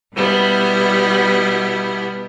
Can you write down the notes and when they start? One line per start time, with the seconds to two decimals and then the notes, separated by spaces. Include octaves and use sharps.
0.13 B2 G3 B3 E4